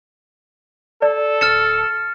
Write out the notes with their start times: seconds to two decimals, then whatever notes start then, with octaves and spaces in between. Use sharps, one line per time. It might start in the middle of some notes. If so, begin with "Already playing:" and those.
1.02 A4 D5
1.41 D1 F6 A6 C#7 E7